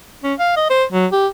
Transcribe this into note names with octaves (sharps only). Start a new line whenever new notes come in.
C#4
F5
D#5
C5
F#3
G4